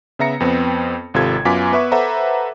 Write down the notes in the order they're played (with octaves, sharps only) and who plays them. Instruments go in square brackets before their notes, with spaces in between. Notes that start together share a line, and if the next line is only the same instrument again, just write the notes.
[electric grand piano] C#3 B3 E5 A#5 A#6 C#7
F2 B3 C4
G#1 C3 F4 A4 G#6
F#2 B3 F4 G#5 D6 B6
B3 B4 E5 C#6
A4 B4 C5 E5 F#5 A#5